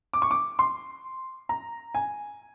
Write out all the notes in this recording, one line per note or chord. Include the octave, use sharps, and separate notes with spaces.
D6
C#6
D6
C6
A#5
G#5